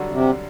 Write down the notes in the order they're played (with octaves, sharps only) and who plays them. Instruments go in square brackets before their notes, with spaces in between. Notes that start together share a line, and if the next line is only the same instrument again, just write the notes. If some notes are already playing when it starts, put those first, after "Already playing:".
Already playing: [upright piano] F#2 D3 G3 D4 F#4
[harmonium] C3